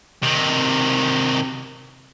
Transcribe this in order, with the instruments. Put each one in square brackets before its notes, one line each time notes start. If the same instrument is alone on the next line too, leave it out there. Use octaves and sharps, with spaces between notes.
[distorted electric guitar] C3 D#3